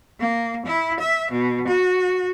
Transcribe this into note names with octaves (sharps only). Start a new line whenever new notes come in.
A#3
E4
E5
B2
F#4